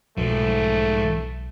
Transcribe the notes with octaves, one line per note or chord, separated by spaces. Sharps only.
B1 G#2 F3 A3